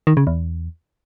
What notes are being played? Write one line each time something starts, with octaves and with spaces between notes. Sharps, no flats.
D#3
C#3
E2